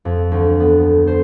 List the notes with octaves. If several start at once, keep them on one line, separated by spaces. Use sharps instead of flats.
F2
D2
B3
C5